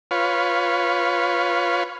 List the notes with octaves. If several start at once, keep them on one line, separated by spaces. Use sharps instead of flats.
F4 B4 C#5